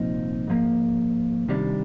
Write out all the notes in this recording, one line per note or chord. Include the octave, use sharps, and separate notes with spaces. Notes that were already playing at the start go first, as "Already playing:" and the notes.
Already playing: C2 A#2 F3 C4 D#4
G#2 F3 A#3
C3 D#3 G3 D4